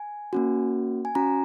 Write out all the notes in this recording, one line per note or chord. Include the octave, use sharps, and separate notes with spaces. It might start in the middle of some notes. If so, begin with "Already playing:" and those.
Already playing: G#5
A#3 C#4 F#4
G#5
C#4 F#4 A#5